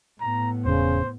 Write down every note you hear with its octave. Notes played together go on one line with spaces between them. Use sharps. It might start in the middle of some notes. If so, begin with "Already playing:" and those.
A2 B3 A#5
E1 C#3 C5